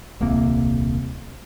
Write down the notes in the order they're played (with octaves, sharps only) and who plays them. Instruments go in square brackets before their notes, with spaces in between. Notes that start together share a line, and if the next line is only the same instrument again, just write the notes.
[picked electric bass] D#1 C2 C3 A#3